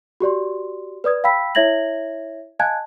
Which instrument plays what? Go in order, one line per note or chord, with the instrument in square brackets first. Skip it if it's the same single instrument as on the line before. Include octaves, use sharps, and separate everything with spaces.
[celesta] F#4 G4 D5 C6
B4 D5 D#6 G#6
F5 G5 B5 E6 B6
E4 C#5 E5 G#6 A#6 F#7
D#5 F5 G#5 A5 F#6 G#6